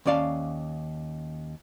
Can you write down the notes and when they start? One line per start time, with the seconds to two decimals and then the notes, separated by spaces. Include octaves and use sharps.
0.06 D#2 C#4 D5 F5 A5